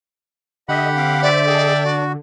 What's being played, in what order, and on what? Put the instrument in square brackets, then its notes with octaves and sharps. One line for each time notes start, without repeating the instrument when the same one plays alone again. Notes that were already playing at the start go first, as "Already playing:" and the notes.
[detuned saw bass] D3 [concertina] G4 F#5 B5 [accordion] D#5 E5
[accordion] C4 F5 D6
[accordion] C5 E5 [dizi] D5
[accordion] G#4 A4 D#5 [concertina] E5 G5
[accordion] D4
[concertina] F#4